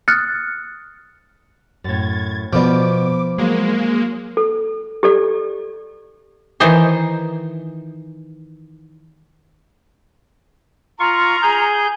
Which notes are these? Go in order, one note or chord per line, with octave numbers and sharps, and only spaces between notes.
D#6 F6 F#6 A6 C#7
F#2 A2 G#6 A6
B2 F3 B3 D5 D6
F#3 G#3 A#3
A4
G4 A4 D5
D#3 E3 D#4 C5
F4 A#5 C#6
G#4 G6